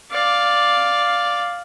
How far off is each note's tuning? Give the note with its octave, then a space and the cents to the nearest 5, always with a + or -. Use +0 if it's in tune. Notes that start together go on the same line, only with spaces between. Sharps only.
D5 +0 F5 +5